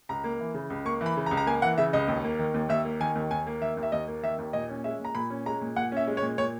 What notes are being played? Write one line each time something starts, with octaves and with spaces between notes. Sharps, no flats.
C#2 A#5
A#3
E3
C#3
C#2
A#3 C#6
E3
B5
C#3
A#5
C#2
A#5
A#3 G#5
E3 F#5
C#3 E5
C#2 D#5
D#2
A#3
D#3
D#2
D#2 E5
A#3
D#3 G#5
D#2
D#2 G#5
A#3
D#3 E5
D#2
E5
D#2 D#5
A#3
D#3 E5
D#2
A#2 D#5
C#4
G#3 E5
A#2 A#5
A#2 B5
C#4
G#3 A#5
A#2
A#2 F#5
C#4 E5
G#3
C#5
A#2
A#2 C#5